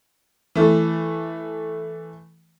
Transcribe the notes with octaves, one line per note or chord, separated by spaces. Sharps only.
E3 A3